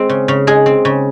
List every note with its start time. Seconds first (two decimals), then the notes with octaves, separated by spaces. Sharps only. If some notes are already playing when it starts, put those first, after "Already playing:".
Already playing: G#3 C4
0.09 C#3
0.28 C#3
0.47 G#3 G#4
0.66 C4
0.85 C#3